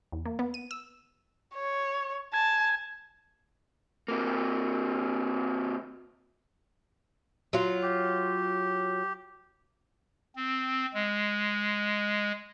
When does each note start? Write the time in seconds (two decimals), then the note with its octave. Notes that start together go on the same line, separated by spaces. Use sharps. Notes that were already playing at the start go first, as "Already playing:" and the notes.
0.12 E2
0.25 A#3
0.39 B3
0.54 D#7
0.71 E6
1.55 C#5
2.34 G#5 A5
4.08 C3 A#3
7.53 F#3 F4
7.83 G4
10.36 C4
10.94 G#3